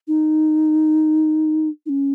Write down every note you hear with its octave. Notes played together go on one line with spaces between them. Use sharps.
D#4
D#4
C#4